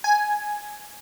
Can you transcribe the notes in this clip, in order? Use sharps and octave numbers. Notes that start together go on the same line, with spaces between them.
G#5